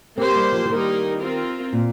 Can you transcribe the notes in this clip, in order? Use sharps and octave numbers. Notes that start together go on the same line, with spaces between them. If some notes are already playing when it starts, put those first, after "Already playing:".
A#3 C4 G4 C5
G3
F3
F3
D#3 G3 A#3 D#4 A#4
C4 F4 A#4
A#2